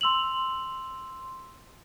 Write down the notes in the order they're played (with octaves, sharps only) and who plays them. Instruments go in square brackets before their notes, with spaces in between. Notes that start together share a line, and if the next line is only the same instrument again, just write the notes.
[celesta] C6 E6 F7 F#7